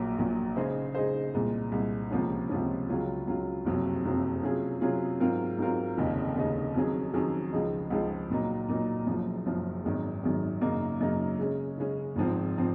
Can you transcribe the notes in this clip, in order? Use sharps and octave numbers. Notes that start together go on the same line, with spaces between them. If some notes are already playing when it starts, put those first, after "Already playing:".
Already playing: A#1 A#2 F#3 A#3
A#1 A#2 F#3 A#3
C#3 G#3 D#4 G#4 C5
C#3 G#3 D#4 G#4 C5
C2 A#2 G#3
C2 A#2 G#3
C#2 C3 F3 A#3 C#4
C#2 C3 F3 A#3 C#4
C#2 C#3 F#3 C#4 F4
C#2 C#3 F#3 C#4 F4
F#1 F2 C3 F#3 C4
F#1 F2 C3 F#3 C4
C3 F#3 C#4 F4 G#4
C3 F#3 C#4 F4 G#4
G#2 F#3 C4 F4 A#4
G#2 F#3 C4 F4 A#4
F1 D#2 C#3 G#3 D#4
F1 D#2 C#3 G#3 D#4
F2 D#3 F#3 C#4 G#4
F2 D#3 F#3 C#4 G#4
C#2 C#3 F3 G#3 D#4
C#2 C#3 F3 G#3 D#4
A#2 F#3 A#3 D#4
A#2 F#3 A#3 D#4
F#1 F#2 F3
F#1 F#2 F3
G#1 F#2 D#3 G#3
G#1 F#2 D#3 G#3
F#2 C#3 F#3 A#3 D#4
F#2 C#3 F#3 A#3 D#4
C#3 G#3 C#4
C#3 G#3 C#4
G#1 G#2 F3 C4
F3 C4